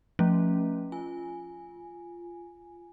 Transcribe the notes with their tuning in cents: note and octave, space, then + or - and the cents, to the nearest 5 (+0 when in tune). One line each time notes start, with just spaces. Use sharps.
F3 +0 A3 +15 C#4 +0
F4 -10 G#5 +0